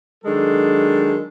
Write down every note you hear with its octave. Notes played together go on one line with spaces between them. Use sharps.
D#3 F#3 G#3 D4 A4